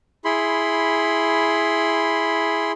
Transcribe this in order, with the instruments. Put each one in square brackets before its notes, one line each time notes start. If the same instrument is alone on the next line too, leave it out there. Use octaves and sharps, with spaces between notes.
[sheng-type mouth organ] E4 G#4 B5 C6